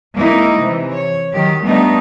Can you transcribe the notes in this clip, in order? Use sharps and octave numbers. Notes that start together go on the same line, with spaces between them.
G#3 A#3 D#4 E4
C3 E3
C#5
D#3 F#3 G4
G3 A3 B3 D4 D#4